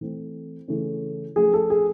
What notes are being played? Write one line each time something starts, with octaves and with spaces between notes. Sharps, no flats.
E3 A3 C4
C#3 E3 A3 C#4
F3 A3 C#4 G#4
A4
G#4